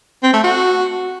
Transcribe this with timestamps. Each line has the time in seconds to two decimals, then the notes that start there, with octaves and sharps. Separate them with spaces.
0.23 C4
0.33 A3
0.44 F#4